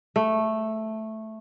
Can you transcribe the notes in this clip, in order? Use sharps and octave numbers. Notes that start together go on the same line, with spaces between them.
A3